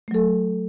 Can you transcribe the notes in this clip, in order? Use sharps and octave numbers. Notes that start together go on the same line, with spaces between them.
F#3 A3 A4